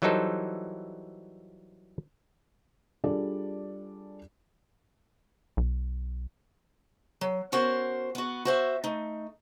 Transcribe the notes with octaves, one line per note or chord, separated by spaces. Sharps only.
E3 F#3 G3 D#4 A4 C5
G3 D4 F4 G#4 A4 D5
B1
F#3
B3 C#4 F#4 A#4 C5
B3 F#4
F#4 C5 E5
A3 D#4